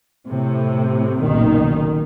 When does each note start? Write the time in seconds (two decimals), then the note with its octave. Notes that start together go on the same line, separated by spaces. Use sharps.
0.27 A2 C3
1.20 F#1 B1 A#2 D#3